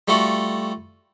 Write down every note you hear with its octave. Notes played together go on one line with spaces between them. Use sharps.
G3 A3 F4 F#4 A4 F#5